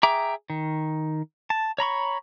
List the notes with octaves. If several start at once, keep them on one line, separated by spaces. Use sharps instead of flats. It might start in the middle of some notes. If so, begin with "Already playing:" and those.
G#4 E5 G5 A#5 D6
D#3
A5
C#5 A#5 B5 C#6